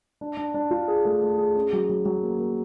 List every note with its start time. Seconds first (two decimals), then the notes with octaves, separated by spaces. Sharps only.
0.21 D4
0.37 D4
0.54 D4
0.71 F4
0.88 G#4
1.05 A3
1.22 A3
1.38 G#4
1.55 C#4
1.73 F#3
1.89 F#3
2.05 F#3
2.23 A#3
2.39 A#3